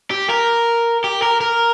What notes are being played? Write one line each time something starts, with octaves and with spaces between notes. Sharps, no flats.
G4
A#4
G4
A#4
A#4